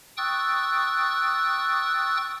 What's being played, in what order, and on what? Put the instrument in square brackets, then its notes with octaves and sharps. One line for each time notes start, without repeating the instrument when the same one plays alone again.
[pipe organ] G5 C#6 D#6 E6 F#6 A6